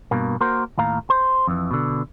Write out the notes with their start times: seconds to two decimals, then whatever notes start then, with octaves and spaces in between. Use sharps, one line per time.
0.11 G2 B2 A#3
0.41 A#3 F#4 A#4 C5
0.78 D#2 A2 F5 A#5
1.10 C5
1.47 F2 E3
1.71 B2 D3